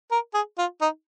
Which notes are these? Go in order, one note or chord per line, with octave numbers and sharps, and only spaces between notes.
A#4
G#4
F4
D#4